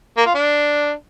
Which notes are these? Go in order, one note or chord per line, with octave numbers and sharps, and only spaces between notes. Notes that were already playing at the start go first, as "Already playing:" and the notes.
A#3
F4
D4